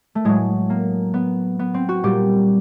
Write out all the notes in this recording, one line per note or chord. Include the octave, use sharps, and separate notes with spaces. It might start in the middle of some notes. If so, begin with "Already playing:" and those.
A3
A2 F#3 G#3
A#3
B3
B3
C4
F#4
A#2 G3 G4